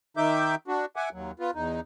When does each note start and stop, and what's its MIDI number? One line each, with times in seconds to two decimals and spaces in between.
0.17 0.55 51
0.17 0.55 63
0.17 0.55 76
0.17 0.55 86
0.17 0.55 91
0.68 0.85 62
0.68 0.85 66
0.96 1.09 76
0.96 1.09 78
0.96 1.09 80
0.96 1.09 86
1.13 1.31 39
1.13 1.31 54
1.40 1.51 59
1.40 1.51 65
1.55 1.80 40
1.55 1.80 63